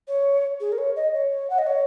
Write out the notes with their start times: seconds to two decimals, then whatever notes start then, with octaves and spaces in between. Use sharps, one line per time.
0.08 C#5
0.60 G#4
0.72 A#4
0.78 C#5
0.96 D#5
1.14 C#5
1.50 F#5
1.58 D#5
1.67 C#5